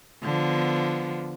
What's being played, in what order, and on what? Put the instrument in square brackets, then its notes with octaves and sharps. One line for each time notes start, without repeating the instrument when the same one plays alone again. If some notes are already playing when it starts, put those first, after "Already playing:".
[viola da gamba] D3 F3 B3